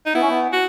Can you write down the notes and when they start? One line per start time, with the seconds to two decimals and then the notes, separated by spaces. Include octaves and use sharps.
0.06 D#4
0.14 B3 E4
0.22 C#4
0.29 B3
0.53 F#4